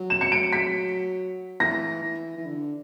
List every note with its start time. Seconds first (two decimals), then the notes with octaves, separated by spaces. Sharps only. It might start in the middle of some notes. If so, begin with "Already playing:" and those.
Already playing: F#3
0.10 E7
0.21 C#7
0.32 D7
0.53 B6
1.60 E3 A#6
2.03 E3
2.37 E3
2.46 D3